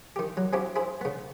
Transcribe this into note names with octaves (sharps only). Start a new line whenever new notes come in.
D#3 G4
F#3
C4 C#4 E4 F#4 G4 C#5
E4 G#4 C5
C#3 B3